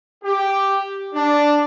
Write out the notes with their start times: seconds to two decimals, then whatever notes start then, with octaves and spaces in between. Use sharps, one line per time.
0.24 G4
1.14 D4